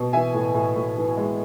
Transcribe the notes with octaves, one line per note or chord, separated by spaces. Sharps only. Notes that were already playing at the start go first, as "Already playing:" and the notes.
Already playing: B2
E3 E5 G#5
A2
A2
A2
E3
G#3